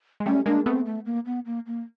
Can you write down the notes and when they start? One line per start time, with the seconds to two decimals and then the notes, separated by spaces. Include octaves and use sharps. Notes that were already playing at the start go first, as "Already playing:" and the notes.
0.20 G#3
0.26 G3 A3 C#4
0.46 G#3 A#3 D4
0.66 A3 B3 C4
0.86 A3
1.06 A#3
1.26 B3
1.46 A#3
1.67 A#3